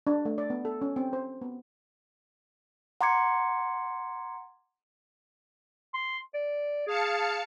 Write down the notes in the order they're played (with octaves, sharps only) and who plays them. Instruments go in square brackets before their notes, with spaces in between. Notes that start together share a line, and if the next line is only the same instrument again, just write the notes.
[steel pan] D4
A3
D5
B3
A4
C#4
C4
C5
B3
[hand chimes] F#5 A#5 C6 D6 G#6 C#7
[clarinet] C6
D5
[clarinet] G#4 [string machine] F5 A5 C#7